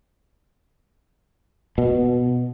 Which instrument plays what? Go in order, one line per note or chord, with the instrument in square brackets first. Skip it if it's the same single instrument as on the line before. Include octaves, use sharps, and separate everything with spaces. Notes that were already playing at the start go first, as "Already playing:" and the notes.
[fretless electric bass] B2